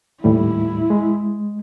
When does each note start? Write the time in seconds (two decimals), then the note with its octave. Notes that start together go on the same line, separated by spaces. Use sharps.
0.24 D#2 A2 G3 E4
0.90 G#3